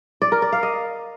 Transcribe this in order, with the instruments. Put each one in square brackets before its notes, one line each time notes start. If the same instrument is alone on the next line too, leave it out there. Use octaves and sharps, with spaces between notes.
[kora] D5
A#4
D5
F5
D#5